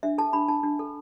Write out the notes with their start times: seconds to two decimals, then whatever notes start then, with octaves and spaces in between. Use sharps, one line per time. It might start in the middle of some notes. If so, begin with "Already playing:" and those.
0.03 D4 E5
0.18 A4 A5
0.33 D4 B5
0.48 D4 A5
0.63 D4
0.79 A4